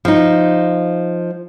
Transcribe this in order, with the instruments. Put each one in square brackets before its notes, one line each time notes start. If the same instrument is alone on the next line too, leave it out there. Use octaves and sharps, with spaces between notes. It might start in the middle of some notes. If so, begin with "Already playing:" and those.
[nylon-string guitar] F3 D#4